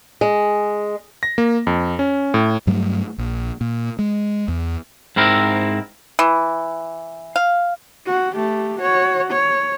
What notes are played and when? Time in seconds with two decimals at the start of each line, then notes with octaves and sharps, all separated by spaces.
0.21 G#3
1.23 A#6
1.38 A#3
1.67 F2
1.99 C#4
2.34 A2
2.67 G2 F#3 G3 A3
3.18 A#1
3.61 A#2
3.99 G#3
4.48 E2
5.16 G#2 C4 E4 A#4
6.19 E3
7.36 F5
8.06 F#4
8.36 A3 G4
8.80 F#4 C#5
9.31 C#5